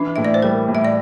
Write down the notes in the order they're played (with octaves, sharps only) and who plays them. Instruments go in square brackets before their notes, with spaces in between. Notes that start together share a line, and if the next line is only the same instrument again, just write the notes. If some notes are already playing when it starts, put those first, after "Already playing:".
Already playing: [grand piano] E3 [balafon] D4
[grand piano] A2 [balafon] E5
[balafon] D5
C5
[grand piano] G3 [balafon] A#4
[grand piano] A2
[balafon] E5
D5